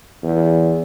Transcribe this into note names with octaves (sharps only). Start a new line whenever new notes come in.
E2